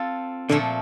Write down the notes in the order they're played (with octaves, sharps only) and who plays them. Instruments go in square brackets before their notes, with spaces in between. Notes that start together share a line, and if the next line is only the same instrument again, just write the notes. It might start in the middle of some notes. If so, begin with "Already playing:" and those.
Already playing: [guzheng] C4 F4 A4
[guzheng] A#2 F3 A3 [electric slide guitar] D3